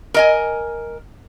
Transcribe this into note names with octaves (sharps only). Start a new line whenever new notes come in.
A#4 D#5 G#5